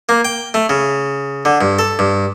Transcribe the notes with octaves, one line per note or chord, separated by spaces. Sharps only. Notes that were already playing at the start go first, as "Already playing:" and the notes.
A#3
G5
A3
C#3
D3
G2
A4
G2